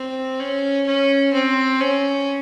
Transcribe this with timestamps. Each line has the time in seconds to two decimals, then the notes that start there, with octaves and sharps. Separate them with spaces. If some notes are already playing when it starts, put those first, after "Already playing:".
Already playing: C4
0.40 C#4
0.87 C#4
1.33 C4
1.80 C#4